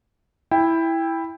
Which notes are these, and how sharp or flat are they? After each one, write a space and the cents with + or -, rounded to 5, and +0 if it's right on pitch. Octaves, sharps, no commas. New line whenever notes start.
E4 +0 G5 +20